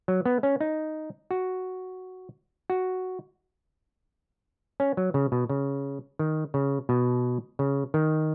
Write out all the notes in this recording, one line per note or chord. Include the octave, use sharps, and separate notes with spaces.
F#3
B3
C#4
D#4
F#4
F#4
C#4
F#3
C#3
B2
C#3
D#3
C#3
B2
C#3
D#3